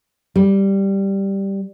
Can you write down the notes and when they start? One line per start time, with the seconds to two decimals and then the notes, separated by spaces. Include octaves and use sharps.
0.36 G3